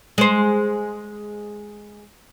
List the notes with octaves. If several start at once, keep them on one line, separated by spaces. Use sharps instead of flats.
G#3 C5